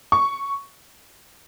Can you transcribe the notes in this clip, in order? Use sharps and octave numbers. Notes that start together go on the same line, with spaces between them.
C#6